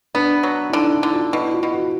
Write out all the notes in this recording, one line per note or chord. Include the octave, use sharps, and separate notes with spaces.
B3 D4
F#3
E4
D3 D#4
E4
D3
F4
B2 E4
F4
B2
F#4